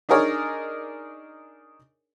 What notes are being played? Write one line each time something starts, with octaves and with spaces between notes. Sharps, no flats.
D4 D#4 G#4 A#4 C#5 D5